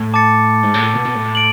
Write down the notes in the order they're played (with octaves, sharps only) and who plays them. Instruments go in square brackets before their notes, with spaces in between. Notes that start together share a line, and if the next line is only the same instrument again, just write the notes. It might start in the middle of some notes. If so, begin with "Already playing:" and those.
Already playing: [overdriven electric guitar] A2
[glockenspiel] A5 D6 A6 C#7
[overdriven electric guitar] G#2
A2
B2
B2
A2
[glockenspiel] D7 F#7